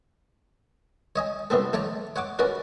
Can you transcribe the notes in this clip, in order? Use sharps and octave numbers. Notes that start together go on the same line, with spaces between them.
C#5 D#5 G#5
C2 C3 B3 C4 A4
A3 C#5 D5 A#5
C#5 F#5 C#6 D6
C#4 F#4 A#4 B4 D5